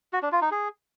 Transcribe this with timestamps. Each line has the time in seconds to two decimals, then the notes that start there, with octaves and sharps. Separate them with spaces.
0.13 F#4
0.23 D4
0.32 F4
0.42 D#4
0.51 G#4